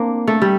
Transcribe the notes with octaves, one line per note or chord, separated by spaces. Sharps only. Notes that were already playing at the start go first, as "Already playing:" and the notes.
Already playing: A#3 C4 D4
A3
G3